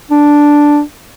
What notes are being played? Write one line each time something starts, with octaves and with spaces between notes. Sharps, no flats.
D4